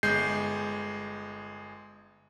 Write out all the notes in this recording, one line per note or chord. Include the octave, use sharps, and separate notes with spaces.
G1 G#3 G6 C7